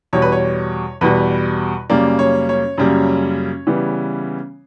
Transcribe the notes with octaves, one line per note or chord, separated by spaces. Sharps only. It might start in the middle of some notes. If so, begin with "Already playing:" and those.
E2 B2 G3 C#5
B4
C#5
E2 B2 G3 B4
F#2 C#3 G3 A#3 D5
C#5
C#5
F#2 C#3 G3 A#3
C#3 E3 G3 B3